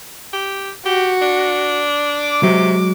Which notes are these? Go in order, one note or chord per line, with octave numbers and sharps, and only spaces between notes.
G4
F#4 G4
D4
D6
C3 F#3 G#3